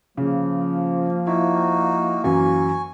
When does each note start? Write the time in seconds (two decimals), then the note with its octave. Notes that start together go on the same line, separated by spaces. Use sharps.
0.17 C#3 F3 A#3
1.27 D#4 E4 F#4
2.24 F#2 E3 F#3 G#5 C#6